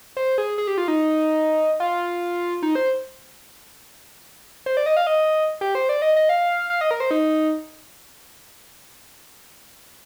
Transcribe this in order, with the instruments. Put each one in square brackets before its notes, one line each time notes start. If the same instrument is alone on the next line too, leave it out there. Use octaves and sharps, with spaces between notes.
[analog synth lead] C5
G#4
G#4
G4
F4
D#4
F4
D#4
C5
C5
D5
D#5
F5
D#5
G4
C5
D5
D#5
D#5
F5
F5
D#5
A#4
C5
D#4